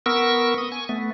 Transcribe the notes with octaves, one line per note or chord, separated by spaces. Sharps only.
B3 A#4 C#6 E6
D#6
G#5 C#6
A3 B3